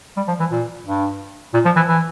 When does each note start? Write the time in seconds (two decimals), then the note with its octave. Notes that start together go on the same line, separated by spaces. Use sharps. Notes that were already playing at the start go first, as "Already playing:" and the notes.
0.16 G3
0.28 F3
0.40 E3
0.51 A#2
0.86 G2
1.54 A#2
1.65 F3
1.76 E3
1.88 E3